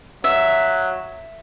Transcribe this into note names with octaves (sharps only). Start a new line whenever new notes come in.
F#3 E5